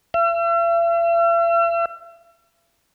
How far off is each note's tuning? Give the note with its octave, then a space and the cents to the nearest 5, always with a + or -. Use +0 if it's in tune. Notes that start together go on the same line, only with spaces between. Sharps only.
E5 +45